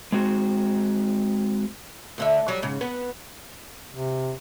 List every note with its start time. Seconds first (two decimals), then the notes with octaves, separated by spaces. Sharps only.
0.12 G#3 C4 F#4
2.18 D2 D3 E5
2.48 F#3 G3
2.62 G#2 C#3
2.81 B3
3.93 C3